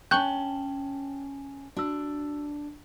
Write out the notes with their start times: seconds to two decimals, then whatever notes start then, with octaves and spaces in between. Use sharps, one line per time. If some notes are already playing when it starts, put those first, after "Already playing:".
0.11 C#4 G5 A5 C#6 F#6 G6 F#7 G7
1.77 D4 F#4 E6